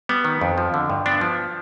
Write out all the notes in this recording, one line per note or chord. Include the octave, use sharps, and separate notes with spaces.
G3 B3
D#3
F2
F3
D3
G2
B3 D4
F3